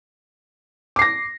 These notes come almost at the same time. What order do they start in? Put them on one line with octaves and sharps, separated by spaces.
D6 C7 A#6